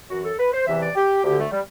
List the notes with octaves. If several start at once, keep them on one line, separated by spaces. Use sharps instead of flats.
F#2 E3 F#4
A4
B4
C5
E2 C3 E3 E5
D5
G4
D2 D3 G4
A3
G3